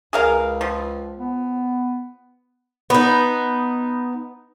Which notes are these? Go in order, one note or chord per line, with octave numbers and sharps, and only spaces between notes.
C#2 G#4 A#4 F5
F3
B3
B3 D#4